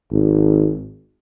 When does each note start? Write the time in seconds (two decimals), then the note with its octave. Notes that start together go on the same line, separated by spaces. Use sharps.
0.12 G#1